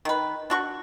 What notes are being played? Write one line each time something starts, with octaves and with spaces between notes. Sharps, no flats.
D#3 B4
D4 F#4 C#6